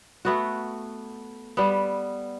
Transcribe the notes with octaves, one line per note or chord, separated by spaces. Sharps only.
A3 B3 F#4
G3 B3